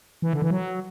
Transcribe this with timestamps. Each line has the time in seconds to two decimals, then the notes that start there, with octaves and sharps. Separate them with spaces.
0.22 E3
0.33 D3
0.42 E3
0.51 F#3